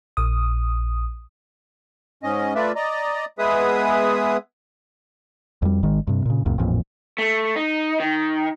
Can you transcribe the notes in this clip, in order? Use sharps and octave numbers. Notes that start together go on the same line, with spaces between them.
A#1 D#6
G#2 C#4 D#5
A3 F4 B4 D5 E5
D5 D#5 A#5
G#3 B3 G#4 B4 E5 D#6
F2 G3
G#1 D#3 G#3
G2 C3
A#2 C#3
C#2 F#2 A#2
A1 F2 A#2
A3
D#4
D#3